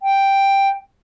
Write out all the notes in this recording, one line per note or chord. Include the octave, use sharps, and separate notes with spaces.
G5